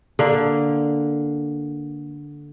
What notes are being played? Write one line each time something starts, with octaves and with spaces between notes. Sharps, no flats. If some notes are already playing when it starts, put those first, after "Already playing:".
D3 A#3